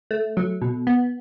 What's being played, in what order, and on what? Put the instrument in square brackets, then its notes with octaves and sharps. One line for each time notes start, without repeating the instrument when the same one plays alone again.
[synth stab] A3
F#3
B2
B3